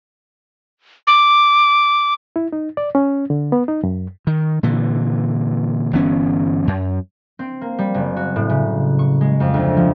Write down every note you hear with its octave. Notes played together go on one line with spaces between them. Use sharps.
D6
E4
D#4
D5
C#4
D3
B3
D#4
F#2
D#3
A#2 D3 E3
G1 E3 B3 C#4
F#2
C4
A#3
G3
F#1
F#4
A2
C#3
C#6
G#3
F2
D2
F3